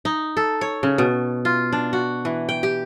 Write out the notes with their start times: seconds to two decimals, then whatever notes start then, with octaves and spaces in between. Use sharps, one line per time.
0.05 D#4
0.37 A4
0.61 C#5
0.83 C#3
0.98 B2
1.45 F4
1.72 D4
1.93 F#4
2.25 E3
2.49 G5
2.63 G4